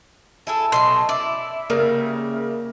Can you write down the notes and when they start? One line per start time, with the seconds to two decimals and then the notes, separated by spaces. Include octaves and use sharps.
0.47 E4 G#4 A4 A5
0.72 B2 F#3 A3 C6
1.09 E4 D5 E5
1.70 C#3 G3 A#3 A#4